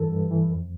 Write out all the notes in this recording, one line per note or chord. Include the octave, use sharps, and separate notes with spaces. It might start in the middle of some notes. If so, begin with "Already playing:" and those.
Already playing: G2 E3 A4
G2
E3
F2